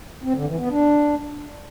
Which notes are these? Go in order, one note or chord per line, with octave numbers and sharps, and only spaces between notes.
C4
D3
E3
B3
D4